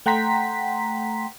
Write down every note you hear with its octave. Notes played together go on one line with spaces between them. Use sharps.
A3 F#5 G5 A#5 C6 B6